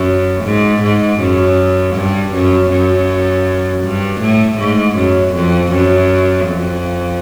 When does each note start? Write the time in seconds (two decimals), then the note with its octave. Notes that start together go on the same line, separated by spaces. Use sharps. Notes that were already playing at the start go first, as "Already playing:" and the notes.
Already playing: F#2
0.45 G#2
0.83 G#2
1.20 F#2
1.95 G2
2.33 F#2
2.71 F#2
3.83 G2
4.21 A2
4.59 G#2
4.96 F#2
5.34 F2
5.72 F#2
6.47 F2